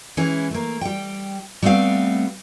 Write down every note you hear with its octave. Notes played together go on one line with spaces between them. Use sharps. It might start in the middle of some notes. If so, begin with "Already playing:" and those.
E3 G#3 C#4 E4
A3 A#3
G3 G5
G3 A3 B3 C4 F5